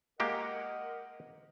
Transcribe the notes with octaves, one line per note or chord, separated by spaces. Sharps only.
G#3 A#3 G4 A#4 D#5 F#5